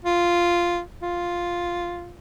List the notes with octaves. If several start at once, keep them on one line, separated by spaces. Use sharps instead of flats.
F4
F4